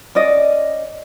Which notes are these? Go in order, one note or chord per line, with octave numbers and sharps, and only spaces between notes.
C#4 D5 D#5